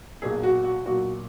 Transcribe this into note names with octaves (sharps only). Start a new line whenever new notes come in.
B1 A#2 F#3 G#4
F#4
F#4
B1 A#2 F#3 F#4